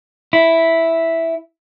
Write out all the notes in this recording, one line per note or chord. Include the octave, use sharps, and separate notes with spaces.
E4